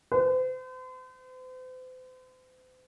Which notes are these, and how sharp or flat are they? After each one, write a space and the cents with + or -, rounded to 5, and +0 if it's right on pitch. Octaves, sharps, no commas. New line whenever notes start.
C5 -40